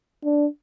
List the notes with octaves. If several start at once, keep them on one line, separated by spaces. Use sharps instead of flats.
D4